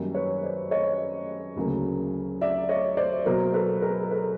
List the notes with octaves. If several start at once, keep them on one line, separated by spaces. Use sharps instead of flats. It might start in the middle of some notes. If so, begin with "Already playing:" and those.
Already playing: F#2 D#3 G3 A#3
B4 C#5
C5 D5
C#5 D#5
D2 C#3 F#3 A#3
D5 E5
C#5 D#5
C5 D5
B2 F#3 A#3 A#4 C5
A4 B4
G#4 A#4
A4 B4